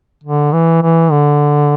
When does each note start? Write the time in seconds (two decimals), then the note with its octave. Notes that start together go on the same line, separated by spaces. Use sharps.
0.23 D3
0.53 E3
0.83 E3
1.11 D3